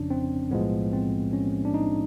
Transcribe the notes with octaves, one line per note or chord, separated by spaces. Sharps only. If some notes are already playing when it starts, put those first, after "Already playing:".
Already playing: G1 F2 C#3 F3 C#4 D4
C4
B1 A2 F3 G#3 B3
C4
C#4
D4
D#4